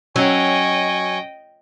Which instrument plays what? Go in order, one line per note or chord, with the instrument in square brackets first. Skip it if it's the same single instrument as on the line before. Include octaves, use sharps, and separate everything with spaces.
[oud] F#3 [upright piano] C#4 [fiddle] D#5 G5 [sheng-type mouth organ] G#5 C#6